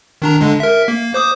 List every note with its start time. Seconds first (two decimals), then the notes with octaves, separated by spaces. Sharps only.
0.22 D#3 D4 A#5
0.40 D3 G#3 D4
0.60 A#4 E5
0.88 A#3
1.14 C5 D6 D#6